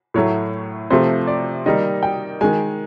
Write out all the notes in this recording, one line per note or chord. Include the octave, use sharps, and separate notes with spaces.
A2 F#3 A3 C#5
C3 F3 A3 C5
D5
D#3 G3 A#3 D#5
G5
D#3 G#3 G#5